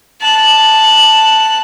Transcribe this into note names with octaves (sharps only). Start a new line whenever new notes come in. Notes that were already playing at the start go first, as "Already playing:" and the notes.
A5 F#6